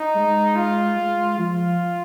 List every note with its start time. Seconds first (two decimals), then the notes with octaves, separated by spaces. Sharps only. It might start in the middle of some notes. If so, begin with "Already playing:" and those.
Already playing: D#4
0.16 G#3
0.56 F4
0.97 G#3
1.38 F3 F4